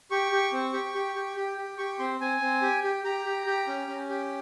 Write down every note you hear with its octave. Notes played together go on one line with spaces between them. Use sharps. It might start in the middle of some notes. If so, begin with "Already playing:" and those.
G4 C#6
G4
C4
G4
G4
G4
G4
G4
G4 C#6
C4 C6
C4 G#5
C4
G4
G4
G4 A#5
G4
G4
C#4
C#4
G4